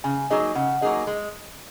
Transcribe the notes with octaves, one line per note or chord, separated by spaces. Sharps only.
C#3 G#5
F#3 A#3 D#4 G#4 D#5
C#3 F#5
F#3 A#3 D#4 G#4 D#5
G#3